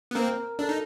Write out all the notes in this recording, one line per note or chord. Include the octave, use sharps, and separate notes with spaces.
B3
A#3 C4 A#4
D4 A4
D#4